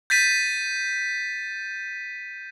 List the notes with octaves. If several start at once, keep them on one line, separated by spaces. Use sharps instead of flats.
G6 A6 B6 D#7